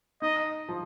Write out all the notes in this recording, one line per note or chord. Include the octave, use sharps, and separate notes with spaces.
D#4 D#5
F3